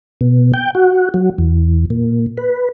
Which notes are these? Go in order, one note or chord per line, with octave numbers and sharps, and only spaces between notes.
B2
G5
F#4
F#3
E2
A#2
B4